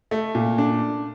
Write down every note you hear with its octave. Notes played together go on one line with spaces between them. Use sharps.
A3
A#2
D4